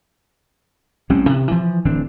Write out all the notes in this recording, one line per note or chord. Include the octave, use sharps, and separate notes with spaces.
A1 G3 C4 C#4
C3
E3 F3
D1 E3 C4 D4